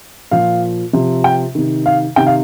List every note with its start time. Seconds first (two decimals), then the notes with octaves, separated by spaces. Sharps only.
0.31 A#2 F3 F5
0.93 C3 F3
1.24 G5
1.55 C3 D#3
1.86 F5
2.16 C3 D#3 G5
2.27 F5